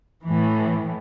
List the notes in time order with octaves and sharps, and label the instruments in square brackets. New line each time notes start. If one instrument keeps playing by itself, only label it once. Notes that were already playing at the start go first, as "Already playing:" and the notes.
[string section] A2 E3